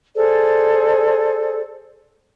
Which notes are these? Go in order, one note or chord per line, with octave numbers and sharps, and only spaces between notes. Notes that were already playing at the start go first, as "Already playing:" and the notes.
G#4 A4 C5 D5